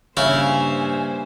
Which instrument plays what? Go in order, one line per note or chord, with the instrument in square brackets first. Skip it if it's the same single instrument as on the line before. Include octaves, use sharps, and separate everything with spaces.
[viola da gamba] G2 A#3 C5 [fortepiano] C#3 [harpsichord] E4 F5 [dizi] G#5